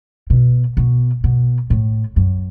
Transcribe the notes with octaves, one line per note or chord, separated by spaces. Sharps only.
B2
B2
B2
A2
F#2